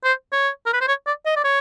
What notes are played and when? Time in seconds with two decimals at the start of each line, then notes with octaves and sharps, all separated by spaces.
0.04 C5
0.32 C#5
0.66 A#4
0.73 B4
0.81 C5
0.88 C#5
1.07 D5
1.26 D#5
1.36 D5
1.44 C#5